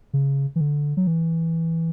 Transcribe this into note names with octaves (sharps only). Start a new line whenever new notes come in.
C#3
E3
D3
F#3
E3